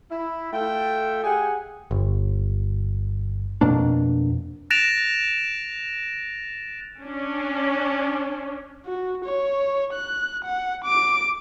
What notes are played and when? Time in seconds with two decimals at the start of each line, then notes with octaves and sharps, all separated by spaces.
0.11 E4
0.53 A3 F4 A4 E5 G5
1.24 G4 G#4 F#5 G#5
1.91 G1
3.61 F2 B2 A#3 D4
4.70 F#6 A6 A#6 D7 E7 F7
7.01 C#4 D4
8.85 F#4
9.25 C#5
9.93 F#6
10.44 F#5
10.84 D6 D7